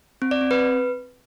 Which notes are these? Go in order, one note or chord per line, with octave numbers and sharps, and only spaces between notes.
C4
D5
C4
B4